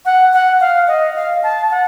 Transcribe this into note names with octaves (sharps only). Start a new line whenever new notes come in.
F#5
F#5
F5
D#5
F5
A5
F#5